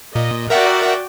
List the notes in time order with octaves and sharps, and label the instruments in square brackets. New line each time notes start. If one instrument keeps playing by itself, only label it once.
[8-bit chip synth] A#2 [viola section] D#5
[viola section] F#4 D5 G5 [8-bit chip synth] A#4 E5 F#5